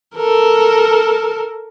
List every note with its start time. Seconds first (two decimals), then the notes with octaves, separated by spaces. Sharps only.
0.16 A4 A#4